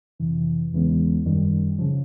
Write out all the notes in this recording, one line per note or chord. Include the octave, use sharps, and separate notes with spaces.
F2 C3 E3
E2 C#3 E3 G#3 B3
F#2 D#3 G3
C#3 F3